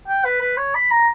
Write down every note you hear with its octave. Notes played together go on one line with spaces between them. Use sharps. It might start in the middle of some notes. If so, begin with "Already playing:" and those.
G5
B4
B4
C#5
B5
A#5